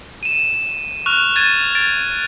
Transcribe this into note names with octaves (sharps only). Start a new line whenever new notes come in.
D#7 E7
C#6 F6 F#6 F7
G#6 A6 D#7
A6 D7